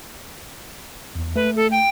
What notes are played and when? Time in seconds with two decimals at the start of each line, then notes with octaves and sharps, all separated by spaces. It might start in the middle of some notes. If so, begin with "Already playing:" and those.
1.15 E2
1.36 A3 B4
1.56 A4
1.71 G5